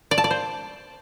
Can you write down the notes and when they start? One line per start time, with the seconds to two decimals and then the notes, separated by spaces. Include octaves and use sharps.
0.11 D5
0.18 A5
0.24 D5
0.31 C5